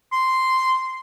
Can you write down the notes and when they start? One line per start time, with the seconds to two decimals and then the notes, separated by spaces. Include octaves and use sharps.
0.13 C6